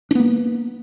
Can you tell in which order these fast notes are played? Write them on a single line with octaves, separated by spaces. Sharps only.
D4 B3 A#3